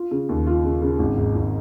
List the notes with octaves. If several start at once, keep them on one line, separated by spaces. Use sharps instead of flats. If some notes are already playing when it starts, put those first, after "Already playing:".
Already playing: F4
C#3
D#2
F4
C#3
C#3
G#1
G#2
G#1